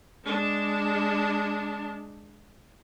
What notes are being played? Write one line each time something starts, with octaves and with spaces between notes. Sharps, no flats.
G#3 D4